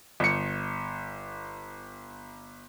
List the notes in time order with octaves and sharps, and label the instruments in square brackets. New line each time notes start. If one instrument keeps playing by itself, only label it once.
[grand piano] G1 C#7